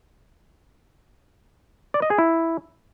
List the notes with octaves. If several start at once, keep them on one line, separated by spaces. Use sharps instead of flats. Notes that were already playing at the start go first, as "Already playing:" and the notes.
D5
D#5
G#4
E4